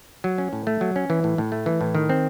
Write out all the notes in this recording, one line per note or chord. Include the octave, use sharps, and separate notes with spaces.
F#3
C#4
A2
A3
F#3
C#4
E3
A2
A2
A3
E3
A2
D#3
C4